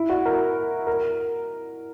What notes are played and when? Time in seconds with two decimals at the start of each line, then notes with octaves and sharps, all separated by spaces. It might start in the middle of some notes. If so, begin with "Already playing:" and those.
Already playing: E4
0.10 F#4
0.26 A#4
0.87 A#4